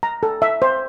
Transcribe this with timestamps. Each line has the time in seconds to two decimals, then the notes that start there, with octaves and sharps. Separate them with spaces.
0.03 A#5
0.23 A4
0.42 E5
0.62 C5